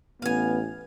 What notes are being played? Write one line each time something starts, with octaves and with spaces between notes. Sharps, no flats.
A1 B3 F5 G#5